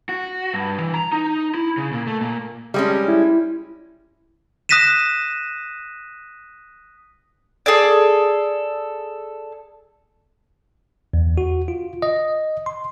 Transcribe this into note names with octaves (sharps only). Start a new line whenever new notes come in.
F#4
G2
E3
A#5
D#4
E4
C#3
A#2
A3
A#2
G3 G#3 C#4
E4
D#6 F#6 A#6 B6 D#7 E7
G#4 A4 D5
E2
F#4
F4
D#5
C6